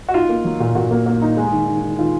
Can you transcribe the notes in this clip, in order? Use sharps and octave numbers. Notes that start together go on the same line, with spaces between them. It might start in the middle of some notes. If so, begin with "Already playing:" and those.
F#4
D#4 F4
A#3
F#3
A#2
A#2 F#4
A#3
A#3
D#4
G#3
D#3
D#3
D#3
D#3 F4